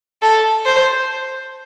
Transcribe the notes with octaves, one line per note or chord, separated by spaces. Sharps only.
A4
C5